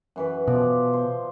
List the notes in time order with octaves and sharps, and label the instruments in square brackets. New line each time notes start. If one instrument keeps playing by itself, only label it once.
[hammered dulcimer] F#2 E3 B4
[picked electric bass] B2 [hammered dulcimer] F3 D5
[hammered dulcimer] C5